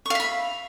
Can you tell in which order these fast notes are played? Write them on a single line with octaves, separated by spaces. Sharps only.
C#6 F5 E5 B5